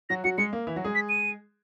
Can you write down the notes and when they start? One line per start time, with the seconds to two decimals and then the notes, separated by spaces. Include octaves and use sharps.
0.09 F#3 F#4 A#6
0.24 F#3 F#4 C#7
0.38 G#3 C#7
0.53 A#3
0.67 E3 E4
0.76 F#3 F#4
0.84 G#3 G#4
0.95 B6
1.09 D#7